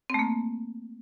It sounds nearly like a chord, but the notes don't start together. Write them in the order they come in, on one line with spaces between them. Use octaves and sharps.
C4 A3 A#3